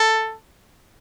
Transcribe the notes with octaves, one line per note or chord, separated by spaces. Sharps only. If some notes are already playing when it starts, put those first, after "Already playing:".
Already playing: A4